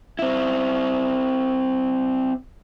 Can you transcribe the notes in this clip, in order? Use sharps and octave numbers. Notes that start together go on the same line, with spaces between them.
C4 E4